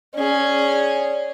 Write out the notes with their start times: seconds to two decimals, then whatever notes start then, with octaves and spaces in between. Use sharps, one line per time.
0.15 C#4 G#4 D5